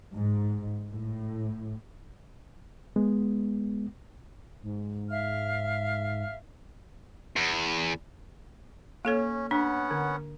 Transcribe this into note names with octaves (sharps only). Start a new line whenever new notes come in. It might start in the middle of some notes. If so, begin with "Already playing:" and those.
G#2
A2
G#3 B3
G#2
E5 F5 F6
E2
A#3 C#4 A4 C#5
B3 C#4 D4 F#5
D3